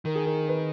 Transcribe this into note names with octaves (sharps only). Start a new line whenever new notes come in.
D#3 A#4
G#4
A#4
B4